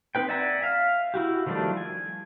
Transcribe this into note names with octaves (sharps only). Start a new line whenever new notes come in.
C4 D#4 B4 G5
D5 E5 F#5 G#5 A#5
E5 F5
E4 F#4 G4
D#3 F3 G3 A3 D4
G#5